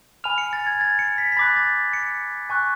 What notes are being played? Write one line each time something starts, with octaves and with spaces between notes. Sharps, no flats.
G#5 B5 F6 F7
C#7
A6
G#6
A6
C#7
B6
B6
B5 D6 F#6 A6
A6
C#7
G#5 C#6 F#6